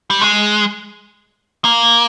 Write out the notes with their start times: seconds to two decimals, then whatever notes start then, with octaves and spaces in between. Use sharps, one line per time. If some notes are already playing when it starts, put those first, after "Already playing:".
0.10 G3
0.21 G#3
1.65 A#3